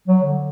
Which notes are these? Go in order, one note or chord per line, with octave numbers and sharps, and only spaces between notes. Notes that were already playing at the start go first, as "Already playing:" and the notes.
F#3
D3